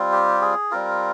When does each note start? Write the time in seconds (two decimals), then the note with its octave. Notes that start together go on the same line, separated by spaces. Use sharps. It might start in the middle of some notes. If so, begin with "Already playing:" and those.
Already playing: G3 C4 F4
0.12 G4
0.42 G#4
0.71 G3 C4 F4 A#4